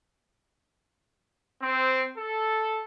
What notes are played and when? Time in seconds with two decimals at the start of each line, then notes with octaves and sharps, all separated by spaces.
1.62 C4
2.17 A4